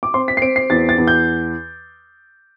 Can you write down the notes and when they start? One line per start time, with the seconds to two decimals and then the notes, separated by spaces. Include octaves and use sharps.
0.03 D6
0.14 C4 C6
0.28 B6
0.37 C7
0.42 C4 D7
0.56 C7
0.70 E2 A6
0.89 A6
0.98 E2
1.07 G6